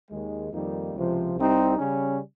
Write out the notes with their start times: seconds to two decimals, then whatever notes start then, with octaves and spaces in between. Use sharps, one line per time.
0.11 D#2 D#3 G#3
0.53 F2 D#3 G3 A#3 D#4
0.95 C#2 C3 F3
1.36 C2 C3 G3 C4 D#4
1.78 C#3 G3 C#4